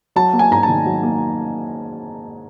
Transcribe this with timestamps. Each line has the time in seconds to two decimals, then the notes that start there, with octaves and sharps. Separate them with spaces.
0.16 F#3 A5
0.33 A#3
0.39 G#5
0.51 G#2 A#5
0.63 A5
0.69 D#3
0.85 F#3
1.03 A#3